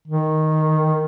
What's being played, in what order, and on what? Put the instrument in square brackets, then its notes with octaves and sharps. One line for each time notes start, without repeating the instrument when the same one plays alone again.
[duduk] D#3